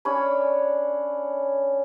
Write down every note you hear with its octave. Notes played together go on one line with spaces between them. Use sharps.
C#4 D4 C#5 B5